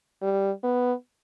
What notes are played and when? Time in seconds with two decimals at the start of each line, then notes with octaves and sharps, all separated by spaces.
0.22 G3
0.63 B3